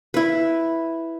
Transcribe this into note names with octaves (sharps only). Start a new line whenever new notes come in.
E4 B4